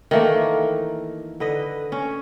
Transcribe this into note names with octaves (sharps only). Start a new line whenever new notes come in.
D#3 E3 A3 A#3
D3 B4 D#5
C#4